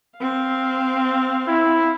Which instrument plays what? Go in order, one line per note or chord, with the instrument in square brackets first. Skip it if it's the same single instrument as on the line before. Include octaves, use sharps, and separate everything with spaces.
[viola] C4 F5
[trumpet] E4